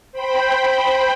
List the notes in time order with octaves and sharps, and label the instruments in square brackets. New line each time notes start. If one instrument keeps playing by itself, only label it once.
[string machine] C5 G5 B5